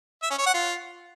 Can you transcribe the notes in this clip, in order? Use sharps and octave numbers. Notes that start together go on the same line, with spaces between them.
E5
C#4
C#5
F#5
F4